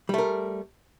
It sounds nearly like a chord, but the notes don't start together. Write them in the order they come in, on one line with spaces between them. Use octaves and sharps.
G3 A3 A#4